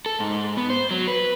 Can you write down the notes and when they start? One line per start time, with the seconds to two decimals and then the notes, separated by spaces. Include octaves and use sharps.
0.06 A4
0.20 G#2
0.57 B3
0.70 C5
0.91 F#3
1.08 B4